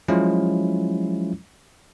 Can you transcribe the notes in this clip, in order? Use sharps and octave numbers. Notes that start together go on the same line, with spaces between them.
F3 F#3 G#3 C#4 E4 F4